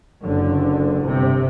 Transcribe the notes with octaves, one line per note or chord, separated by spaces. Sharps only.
F#1 D3
G1 C3